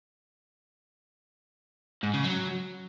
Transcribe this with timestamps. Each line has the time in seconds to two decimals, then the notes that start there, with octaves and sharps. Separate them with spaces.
2.03 G#2
2.14 C#3
2.24 F#3